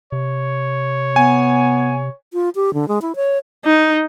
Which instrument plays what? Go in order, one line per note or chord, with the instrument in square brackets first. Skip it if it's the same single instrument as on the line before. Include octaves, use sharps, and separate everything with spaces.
[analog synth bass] C3 [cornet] C#5
[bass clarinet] B3 [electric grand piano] G#5
[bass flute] F4
G4
D3
G#3
E4
C#5
[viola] D#4